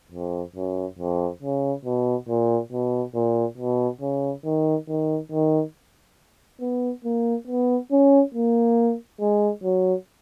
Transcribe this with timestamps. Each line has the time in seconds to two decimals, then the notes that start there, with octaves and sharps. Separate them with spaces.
0.12 F2
0.56 F#2
0.98 F2
1.42 C#3
1.85 B2
2.29 A#2
2.72 B2
3.15 A#2
3.58 B2
4.01 C#3
4.45 D#3
4.89 D#3
5.32 D#3
6.61 B3
7.05 A#3
7.47 B3
7.92 C#4
8.34 A#3
9.20 G#3
9.64 F#3